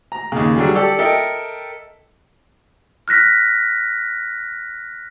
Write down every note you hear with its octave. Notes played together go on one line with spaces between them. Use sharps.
A#5
D#2 C#3
D3 F#3 G3 G#4
G4 A4 D5
A4 A#4 D#5 E5 G5
F6 F#6 A#6 B6